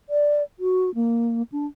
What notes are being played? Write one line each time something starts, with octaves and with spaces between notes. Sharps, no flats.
D5
F#4
A#3
D4